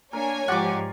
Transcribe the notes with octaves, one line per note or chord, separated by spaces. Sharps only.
A#3 D4 A#4 C#5 G#5
G#2 F3 F4 G4 D5 F#5 C#6 D6